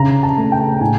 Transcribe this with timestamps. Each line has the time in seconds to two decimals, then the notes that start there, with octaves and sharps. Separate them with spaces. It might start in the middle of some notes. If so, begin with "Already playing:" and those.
Already playing: C#3 A#5
0.23 A5
0.38 A3
0.52 G5
0.74 A5
0.81 A2 G#5